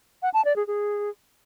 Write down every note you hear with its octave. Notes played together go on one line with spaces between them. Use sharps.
F#5
A5
D5
G#4
G#4